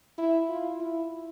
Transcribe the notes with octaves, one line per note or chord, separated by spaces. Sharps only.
E4
F4
E4